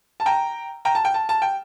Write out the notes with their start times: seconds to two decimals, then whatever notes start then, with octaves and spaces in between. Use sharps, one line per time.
0.20 A5
0.26 G5 A#5
0.85 G5 A#5
0.95 A5
1.05 G5
1.14 A5
1.29 A5
1.42 G5